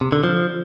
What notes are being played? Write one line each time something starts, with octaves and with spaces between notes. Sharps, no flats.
C3
D3
F3